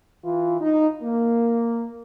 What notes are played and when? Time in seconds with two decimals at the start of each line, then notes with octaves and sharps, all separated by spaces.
0.25 E3 F4
0.61 D#4
1.02 A#3